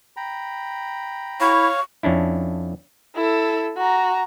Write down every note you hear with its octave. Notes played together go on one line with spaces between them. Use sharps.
G5 A#5 B5
E4 C#5 F5 C#6
F2 C#4 D4 E4
E4 A4
F#4 A#5